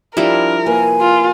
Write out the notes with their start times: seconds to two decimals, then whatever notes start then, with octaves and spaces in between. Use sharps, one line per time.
0.17 F3 G3 D4 E4 A#4 D5
0.66 C3 A#3 B4 G#5
1.01 F4